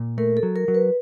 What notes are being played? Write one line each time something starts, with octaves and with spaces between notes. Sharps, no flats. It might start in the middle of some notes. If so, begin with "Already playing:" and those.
Already playing: A#2
A3 A#4
A4
F#3
A#4
F#3
B4